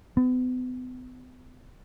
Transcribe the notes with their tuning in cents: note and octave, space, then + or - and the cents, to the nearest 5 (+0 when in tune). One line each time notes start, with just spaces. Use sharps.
B3 +40